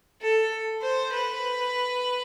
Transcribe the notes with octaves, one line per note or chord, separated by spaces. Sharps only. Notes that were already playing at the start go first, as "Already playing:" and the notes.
A4
C5
B4